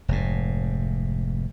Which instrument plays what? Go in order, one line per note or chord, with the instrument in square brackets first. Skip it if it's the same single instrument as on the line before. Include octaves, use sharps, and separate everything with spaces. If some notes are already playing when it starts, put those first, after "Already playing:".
[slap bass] F1 G#2